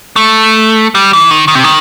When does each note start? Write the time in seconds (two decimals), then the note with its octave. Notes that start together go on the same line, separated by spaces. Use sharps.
0.16 A3
0.95 G3
1.13 E3
1.31 D#3
1.48 D#3
1.55 C3
1.64 D#3